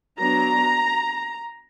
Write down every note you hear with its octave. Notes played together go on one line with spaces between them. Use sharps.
F#3 B3 D4 A#5